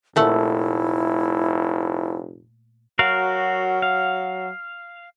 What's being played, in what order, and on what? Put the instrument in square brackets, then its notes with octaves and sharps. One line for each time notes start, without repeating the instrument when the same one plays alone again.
[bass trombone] F1 [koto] A#2 A3 F#5 [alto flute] E4
[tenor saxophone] F#3 [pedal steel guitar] F#4 A#4 F5
[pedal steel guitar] F5